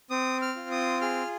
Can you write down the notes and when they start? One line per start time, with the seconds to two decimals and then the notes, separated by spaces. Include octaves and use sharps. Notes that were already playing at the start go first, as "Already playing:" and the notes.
0.10 C4 D#6
0.42 F6
0.56 F4
0.71 D#6
1.01 G#4 F6